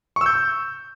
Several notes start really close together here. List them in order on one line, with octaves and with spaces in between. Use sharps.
C#6 E6 G6